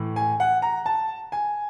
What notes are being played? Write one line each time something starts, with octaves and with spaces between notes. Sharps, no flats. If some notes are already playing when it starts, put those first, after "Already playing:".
Already playing: A2 E3
G#5
F#5
A#5
A5
G#5